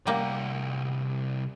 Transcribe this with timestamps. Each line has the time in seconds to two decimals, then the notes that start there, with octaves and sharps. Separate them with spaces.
0.07 C2 G3 A#3 F#5